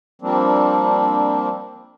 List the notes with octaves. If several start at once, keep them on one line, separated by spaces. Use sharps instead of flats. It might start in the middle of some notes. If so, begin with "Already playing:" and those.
F3 G3 A#3 C4 D4